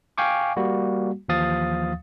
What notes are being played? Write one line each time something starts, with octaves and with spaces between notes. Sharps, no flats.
F5 G5 G#5 C#6 D6
G3 A#3 F#4
D#2 E3 F3 F5 D#6 A6